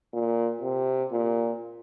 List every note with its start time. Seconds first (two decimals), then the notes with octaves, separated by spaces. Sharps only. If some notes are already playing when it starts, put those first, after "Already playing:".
0.14 A#2
0.62 C3
1.11 A#2